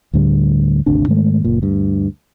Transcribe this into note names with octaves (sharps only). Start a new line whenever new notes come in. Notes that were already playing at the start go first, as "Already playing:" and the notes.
D2 A2 D3 G3
G#1 D2 C3 D4
G#2 D#3 G#3 A3
F#1 A#2
D2 G2